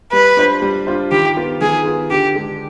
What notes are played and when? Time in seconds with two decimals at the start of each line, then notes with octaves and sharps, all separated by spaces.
0.12 G3 B4
0.37 D4 F4 C5
0.62 G3
0.87 D4 F4 C5
1.12 D#3 G4
1.37 B3 F4
1.61 D#3 G#4
1.86 B3 F4
2.11 D3 G4
2.35 G#3 D4 G4